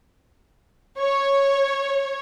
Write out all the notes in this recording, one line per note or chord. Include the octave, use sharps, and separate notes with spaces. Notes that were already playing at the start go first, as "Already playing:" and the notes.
C#5